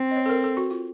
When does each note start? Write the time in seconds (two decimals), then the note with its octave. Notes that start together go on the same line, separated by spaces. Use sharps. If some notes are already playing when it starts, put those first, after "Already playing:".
Already playing: C4
0.11 D#5
0.16 C#5
0.26 A4
0.29 A#4
0.44 A4
0.57 F#4
0.71 F4